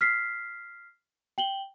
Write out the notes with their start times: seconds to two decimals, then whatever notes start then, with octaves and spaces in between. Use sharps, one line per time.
0.01 F6 B6 C7
1.38 G5 F#7 G7